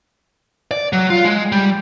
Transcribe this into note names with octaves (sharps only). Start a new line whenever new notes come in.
D5
F#3
F4
G#3
G3